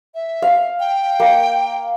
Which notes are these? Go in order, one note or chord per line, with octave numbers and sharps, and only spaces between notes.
E5
F5
G5
A#3